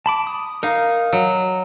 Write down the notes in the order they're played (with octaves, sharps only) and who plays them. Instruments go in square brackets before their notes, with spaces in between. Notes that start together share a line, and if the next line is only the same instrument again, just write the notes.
[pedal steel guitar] A5 B5 D6
D#6
[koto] D#4 [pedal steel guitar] A#4 F5
[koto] F#3